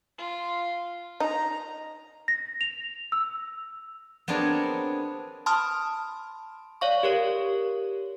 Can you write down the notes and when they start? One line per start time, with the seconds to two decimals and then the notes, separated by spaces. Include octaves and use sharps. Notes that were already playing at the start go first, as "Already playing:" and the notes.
0.18 F4
1.20 D#4 A#5
2.28 A#6
2.61 F7
3.12 E6
4.28 B3 C4 D4 G#4 A#4 C#5
5.46 A5 B5 C6 D#6 F6
6.81 C#5 D5 F5 C#6
7.03 G4 A#4 C#5